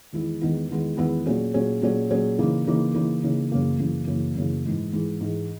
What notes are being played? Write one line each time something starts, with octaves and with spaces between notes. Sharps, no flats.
E2 D#3 G#3 B3 E4
E2 D#3 G#3 B3 E4
E2 D#3 G#3 B3 E4
E2 D#3 G#3 B3 E4
A#2 F#3 C#4 G#4
A#2 F#3 C#4 G#4
A#2 F#3 C#4 G#4
A#2 F#3 C#4 G#4
C#3 E3 A#3 D#4
C#3 E3 A#3 D#4
C#3 E3 A#3 D#4
C#3 E3 A#3 D#4
F#2 C#3 E3 A#3
F#2 C#3 E3 A#3
F#2 C#3 E3 A#3
F#2 C#3 E3 A#3
G#2 E3 G#3
G#2 E3 G#3
G#2 E3 G#3